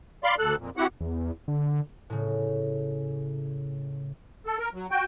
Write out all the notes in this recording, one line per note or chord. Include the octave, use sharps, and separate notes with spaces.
D5 F5 B5 C6
D2 A4 F#6
F2 A#2
C4 E4 F#4 G4 F#5
E2
D3
A2 C#3
A4
A#4
F#3
F#4 G5